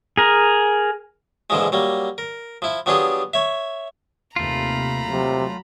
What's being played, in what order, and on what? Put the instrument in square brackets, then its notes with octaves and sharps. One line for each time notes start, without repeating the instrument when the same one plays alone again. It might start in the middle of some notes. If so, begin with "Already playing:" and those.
[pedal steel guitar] G#4 A#4
[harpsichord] A#1 D3 E3 F3 G#3
F#3 G3 A#3
A#4
F3 E4
F3 F#3 B3 D4 G4 G#4
C#5 E5
[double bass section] D#2 C3 [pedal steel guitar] A3 F4 [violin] A#5 B5
[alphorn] C3 [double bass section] F#3